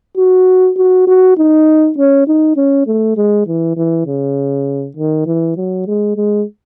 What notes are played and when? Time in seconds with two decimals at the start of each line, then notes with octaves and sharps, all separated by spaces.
0.17 F#4
0.77 F#4
1.07 F#4
1.37 D#4
1.98 C#4
2.27 D#4
2.56 C#4
2.87 A3
3.17 G#3
3.47 E3
3.77 E3
4.07 C#3
4.97 D#3
5.26 E3
5.57 F#3
5.87 G#3
6.17 G#3